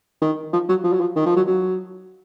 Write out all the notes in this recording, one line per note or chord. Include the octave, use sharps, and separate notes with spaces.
D#3
F3
F#3
F3
F#3
F3
D#3
F3
F#3
F#3